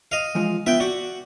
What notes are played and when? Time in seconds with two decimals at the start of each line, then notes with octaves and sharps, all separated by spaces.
0.12 D#5 F5
0.35 E3 F3 G#3
0.67 B3 F4 E5 G5
0.80 F#4 D5